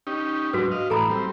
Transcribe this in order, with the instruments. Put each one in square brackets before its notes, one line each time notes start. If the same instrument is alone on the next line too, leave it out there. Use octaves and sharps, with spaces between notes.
[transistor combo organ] C#4 D#4 G4
[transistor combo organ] G#2 F#3 D4 [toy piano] F#4 B4
[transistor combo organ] D#5 F5
[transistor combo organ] A2 E3 [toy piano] A4 A#5 B5
[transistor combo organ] G3 C4